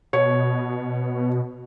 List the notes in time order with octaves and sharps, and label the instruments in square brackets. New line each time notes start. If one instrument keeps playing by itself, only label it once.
[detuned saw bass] B2 [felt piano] C#5